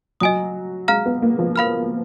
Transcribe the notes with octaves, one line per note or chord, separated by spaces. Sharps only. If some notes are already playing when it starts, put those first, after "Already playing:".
F#3 D#5 G#5 D#6
G#3 F5 A#5 F6
B3
A#3
F3
A#4 F5 B5 F6